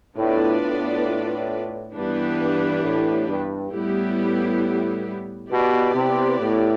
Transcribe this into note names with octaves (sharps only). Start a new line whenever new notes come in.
A2 B3 D4 F4 B4 D5
A2
G2 E3 B3 D4 G4 B4
G2
A2
G2
A2 G3 B3 E4 G4
B2 B3 E4 G4 B4 D5
C3
A2